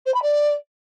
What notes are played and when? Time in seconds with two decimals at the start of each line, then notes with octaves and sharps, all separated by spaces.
0.06 C5
0.14 B5
0.23 D5